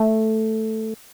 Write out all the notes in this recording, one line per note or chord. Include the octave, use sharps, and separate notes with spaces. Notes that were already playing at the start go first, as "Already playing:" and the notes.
Already playing: A3